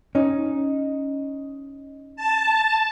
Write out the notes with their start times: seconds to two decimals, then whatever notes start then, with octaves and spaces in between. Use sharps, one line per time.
0.15 C#4 D#4
2.16 A5